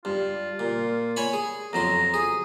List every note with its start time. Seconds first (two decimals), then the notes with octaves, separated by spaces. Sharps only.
0.05 G2 F4
0.59 A#2
1.17 C#5 G#5 B5
1.33 G#4
1.73 F2 F#3 A#5 C6
2.14 G#4 D#6